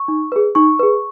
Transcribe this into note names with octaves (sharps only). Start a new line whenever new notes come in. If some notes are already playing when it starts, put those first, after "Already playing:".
Already playing: C#6
D#4
G#4 B4
D#4 C#6
G#4 B4